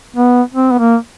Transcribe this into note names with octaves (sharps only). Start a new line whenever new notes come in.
B3
C4
B3
A#3